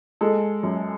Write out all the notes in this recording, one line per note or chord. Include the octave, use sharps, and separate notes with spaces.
G#3 A4
F#2